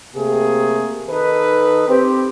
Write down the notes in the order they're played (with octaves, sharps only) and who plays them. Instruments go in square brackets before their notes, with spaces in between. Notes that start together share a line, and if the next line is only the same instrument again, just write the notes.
[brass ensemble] C3 A3 A#3 G4 G#4
D#3 D#4 A4 B4
C4 G4